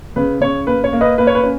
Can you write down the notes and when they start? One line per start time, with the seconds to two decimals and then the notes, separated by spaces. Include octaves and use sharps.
0.16 C#3 B4
0.41 C#3 C#5
0.67 A#3 B4
0.84 C#5
0.93 A#3
1.01 B4 D#5
1.18 A#3 B4
1.27 C#5
1.35 B4
1.43 C#4